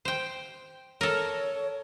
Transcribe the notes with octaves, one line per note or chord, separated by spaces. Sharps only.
C5 G5
A4 A#4 C#5